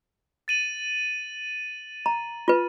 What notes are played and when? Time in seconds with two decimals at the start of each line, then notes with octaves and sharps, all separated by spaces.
0.48 A6 D#7 F#7
2.06 A#5
2.48 F4 B4